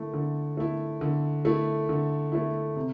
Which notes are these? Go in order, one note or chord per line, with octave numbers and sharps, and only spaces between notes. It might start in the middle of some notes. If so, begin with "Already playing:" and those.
Already playing: D3 A3 E4
D3
A3 E4
D3
A3 E4
D3
A3 E4
C3